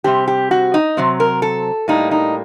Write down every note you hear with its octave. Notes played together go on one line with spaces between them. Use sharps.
C3 G3 C4 G4
G4
F#4
D#4
C3 F#3 C4
A#4
A4
A2 G3 A#3 D#4
D#4